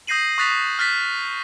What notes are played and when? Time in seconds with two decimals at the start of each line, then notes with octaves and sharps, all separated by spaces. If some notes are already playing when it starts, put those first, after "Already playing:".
0.07 D#6 G6 A#6 C7 D#7 F#7
0.38 C#6 D#6 F#6 A6 B6 F7
0.78 D#6 F6 F#6 A6 B6